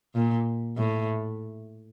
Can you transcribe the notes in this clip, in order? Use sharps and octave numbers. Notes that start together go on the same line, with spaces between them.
A#2
A2